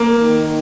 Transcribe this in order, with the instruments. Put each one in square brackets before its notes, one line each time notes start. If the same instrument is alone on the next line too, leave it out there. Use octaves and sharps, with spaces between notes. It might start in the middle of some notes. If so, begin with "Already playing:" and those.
Already playing: [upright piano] A#3
[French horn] D#3